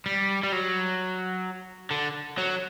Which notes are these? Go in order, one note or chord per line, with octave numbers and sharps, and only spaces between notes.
G3
G3
F#3
D3
F#3